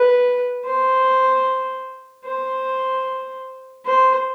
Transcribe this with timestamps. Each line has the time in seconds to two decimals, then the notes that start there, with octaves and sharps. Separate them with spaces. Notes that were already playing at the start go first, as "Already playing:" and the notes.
Already playing: B4
0.65 C5
2.25 C5
3.86 C5